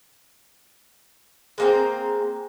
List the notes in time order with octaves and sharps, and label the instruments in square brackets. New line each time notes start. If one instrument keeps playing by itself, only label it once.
[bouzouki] G#3 A#3 C4